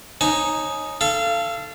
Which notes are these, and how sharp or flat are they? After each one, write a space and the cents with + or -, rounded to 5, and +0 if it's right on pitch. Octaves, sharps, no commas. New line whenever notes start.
D#4 +0 C#5 -20 G#5 +30
A4 +0 F5 -25